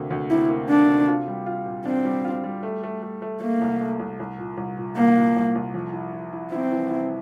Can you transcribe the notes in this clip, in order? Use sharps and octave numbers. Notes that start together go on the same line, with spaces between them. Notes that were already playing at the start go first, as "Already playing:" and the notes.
Already playing: D2 C3 A#3
D2
C3 E4
A#3
A#3 D4
C3
F4
G3
F4
A#2
C4 D4
G3
F4
G3
A3
A3
A3
A3
A3 A#3
C2
A3
C2
C2
A#2
C2
A#2
C2 A#3
A#2
C2
C2
F2
E4
E4
E4
C4 E4
E3
E4